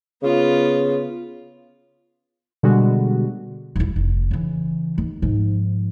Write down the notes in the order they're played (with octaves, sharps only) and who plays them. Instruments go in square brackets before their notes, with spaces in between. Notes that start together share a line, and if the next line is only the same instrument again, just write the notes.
[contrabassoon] C#3 [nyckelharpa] B3 F4
[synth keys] B2 D3 G3 G#3 F#4
[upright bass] D#1 E4
F1
C#3 E3
D#2
G#2 F3